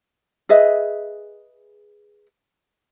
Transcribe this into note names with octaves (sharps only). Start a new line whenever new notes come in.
G#4 B4 D#5 E5